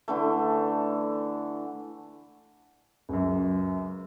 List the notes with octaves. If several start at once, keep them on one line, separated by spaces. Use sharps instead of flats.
D3 E3 A3
C#2 F#2